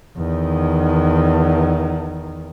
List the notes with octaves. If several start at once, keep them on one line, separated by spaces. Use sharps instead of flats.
E2 D#3